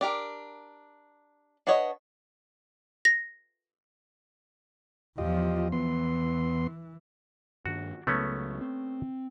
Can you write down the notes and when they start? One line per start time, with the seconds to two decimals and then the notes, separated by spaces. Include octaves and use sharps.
0.01 D4 G4 A#4
1.67 D4 F#4 B4 C#5 D#5
3.05 A#6
5.18 E2 F3 F4 G4 D#5
5.72 E2 E3 B3 C6
7.66 G2 D#3 D4 F#4
8.07 C#2 C#3 F#3 A3 B3 C#4
8.61 C4